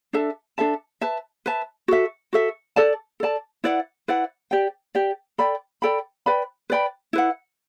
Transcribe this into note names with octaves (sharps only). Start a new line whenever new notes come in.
D4 A4 E5 A5
D4 A4 E5 A5
B4 E5 A5
B4 E5 A5
F#4 A4 E5
F#4 A4 E5
A4 D5 A5
A4 D5 A5
E4 B4 D5 F#5
E4 B4 D5 F#5
G4 D5 G5
G4 D5 G5
A4 D5 G5 B5
A4 D5 G5 B5
B4 D5 G5 B5
B4 D5 G5 B5
E4 B4 F#5